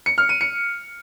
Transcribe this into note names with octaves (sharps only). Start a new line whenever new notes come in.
C#7
F6
D#7
C#7